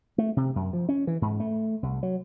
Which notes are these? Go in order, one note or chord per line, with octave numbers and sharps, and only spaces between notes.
A3
C3
F#2
F3
C#4
E3
G#2
A3
C2
F#3